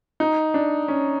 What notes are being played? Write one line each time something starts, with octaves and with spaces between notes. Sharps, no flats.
D#4
D4
C#4